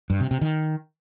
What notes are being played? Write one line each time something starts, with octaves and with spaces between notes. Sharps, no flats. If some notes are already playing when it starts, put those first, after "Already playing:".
G2
C3
C3
D#3